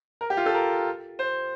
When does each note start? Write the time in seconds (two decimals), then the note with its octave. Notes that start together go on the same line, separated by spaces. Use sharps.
0.21 A#4
0.30 G4
0.37 F4
0.46 A4
0.55 A#4
1.19 C5